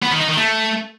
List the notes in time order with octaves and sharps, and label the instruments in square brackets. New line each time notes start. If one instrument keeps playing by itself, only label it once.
[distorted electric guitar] B3
D#3
D#4
D#3
A3